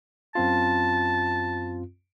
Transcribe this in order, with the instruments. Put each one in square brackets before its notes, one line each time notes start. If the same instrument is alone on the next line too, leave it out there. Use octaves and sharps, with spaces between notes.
[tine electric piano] F#2 C4 F4 [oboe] A5